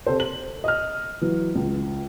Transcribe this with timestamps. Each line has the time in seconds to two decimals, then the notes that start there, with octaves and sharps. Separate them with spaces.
0.06 C3 A4 C5
0.20 F#7
0.64 D#5 F6
1.21 E3 F#3
1.55 C#2